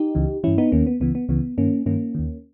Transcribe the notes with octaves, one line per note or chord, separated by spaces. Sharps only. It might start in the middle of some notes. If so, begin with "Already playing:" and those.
Already playing: D#4 G4
C#2 C#3 E3
G2 E3 C#4 E4
B3 D#4
D#2 D#3 A#3 C#4
B3
C#2 C#3 E3 B3
B3
C#2 C#3 E3 B3
G2 D#3 A#3 C#4
G2 D#3 A#3 C#4
D#2 D#3